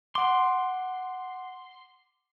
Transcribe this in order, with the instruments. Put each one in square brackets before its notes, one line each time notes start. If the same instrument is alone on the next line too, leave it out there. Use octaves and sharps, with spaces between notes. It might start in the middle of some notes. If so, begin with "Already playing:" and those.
[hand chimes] F#5 D6 [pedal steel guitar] C6